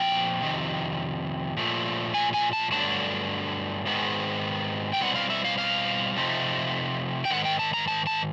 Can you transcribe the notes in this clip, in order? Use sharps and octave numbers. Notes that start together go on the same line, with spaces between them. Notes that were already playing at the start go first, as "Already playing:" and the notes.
Already playing: A#2 F3 A3 C4 E4 G5
F2 C3 D#3
A#2 F3 A3
G#5
G#5
A5
G2 D3 F#3 A3 D4 A5
G#2 D#3 G#3 B3
G5
B2 G3 C4 E4 F#5
F5
E5
F5
F5
C3 F3 A3 C4 D#4
G5
G#2 D#3 F#5
G5
A5
A#5
A5
A5